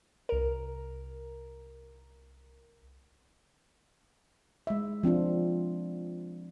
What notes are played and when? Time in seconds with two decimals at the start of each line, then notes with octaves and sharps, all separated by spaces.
0.29 C2 A#4
4.67 G#3 E5
5.03 F3 C4 D4 F4